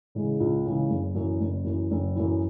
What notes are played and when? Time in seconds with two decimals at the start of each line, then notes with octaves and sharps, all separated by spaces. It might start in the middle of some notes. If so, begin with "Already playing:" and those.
0.15 C#3 E3 G#3
0.40 C#2
0.66 C#3 E3 G#3
0.90 F#1
1.15 F#2 E3
1.40 F#1
1.65 F#2 E3
1.91 F#1
2.15 F#2 E3